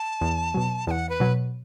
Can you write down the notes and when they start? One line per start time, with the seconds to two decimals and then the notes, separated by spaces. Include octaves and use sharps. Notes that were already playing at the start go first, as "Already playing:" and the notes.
Already playing: A5
0.21 E2
0.54 B2 F#3
0.87 E2 A5
0.91 F#5
1.09 B4
1.20 B2 F#3